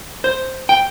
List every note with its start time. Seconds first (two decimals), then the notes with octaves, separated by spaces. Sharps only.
0.24 C5
0.69 G5